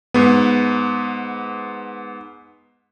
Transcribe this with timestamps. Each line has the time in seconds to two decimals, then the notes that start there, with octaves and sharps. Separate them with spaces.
0.14 G#2 B3